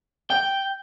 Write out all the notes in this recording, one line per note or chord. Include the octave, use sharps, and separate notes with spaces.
G5